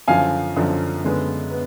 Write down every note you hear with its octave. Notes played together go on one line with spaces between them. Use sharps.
F#2 D3 F3 F5 G#5
F#2 D3 F3
F#2 D3 G#3 B3
B3